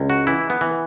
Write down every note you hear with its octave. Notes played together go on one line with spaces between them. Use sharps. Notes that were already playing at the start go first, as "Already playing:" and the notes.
Already playing: C#2
F#4
E3 E4
B3
E3